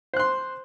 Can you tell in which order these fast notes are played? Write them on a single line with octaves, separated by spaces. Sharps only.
C5 F#6 C6